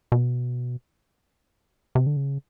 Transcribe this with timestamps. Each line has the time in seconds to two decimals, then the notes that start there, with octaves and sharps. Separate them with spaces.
0.12 B2
1.95 C3
2.07 D3
2.17 C#3